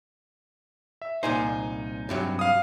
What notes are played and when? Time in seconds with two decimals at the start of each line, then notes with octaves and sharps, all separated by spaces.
1.02 E5
1.23 C2 A#2 D#4 C5 G#5
2.09 G2 C3 F#3
2.39 F5 D#6